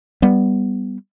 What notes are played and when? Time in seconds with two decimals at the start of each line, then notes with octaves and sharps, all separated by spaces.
0.22 G3 B3